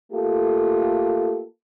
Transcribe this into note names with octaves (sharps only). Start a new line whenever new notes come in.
A3 A#3 F4 G4 A4